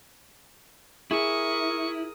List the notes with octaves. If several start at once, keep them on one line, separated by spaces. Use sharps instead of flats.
E4 G#4 A#4 C#6 D#6